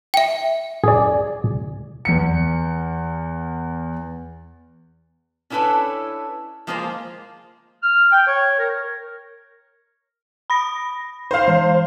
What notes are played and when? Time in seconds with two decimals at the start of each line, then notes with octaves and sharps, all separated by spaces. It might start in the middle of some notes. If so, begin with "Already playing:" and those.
0.14 E5 G5
0.84 G#4 D5
2.05 E2 C#7
5.50 C#4 D4 E4 A4 B4 C#5
6.67 F3 G#3 A#3 F4 G#4 C5
7.82 F6
8.12 G5
8.27 C#5
8.59 A#4
10.50 B5 A#6
11.31 C5 F5
11.48 E3